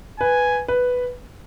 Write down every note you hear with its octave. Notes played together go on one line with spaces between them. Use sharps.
B4 G#5
B4